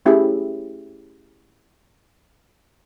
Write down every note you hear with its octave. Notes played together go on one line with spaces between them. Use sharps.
A3 C#4 E4 G4 G#4 E5